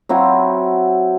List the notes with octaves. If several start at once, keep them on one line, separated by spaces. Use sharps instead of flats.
F#3 C4 E4 F#4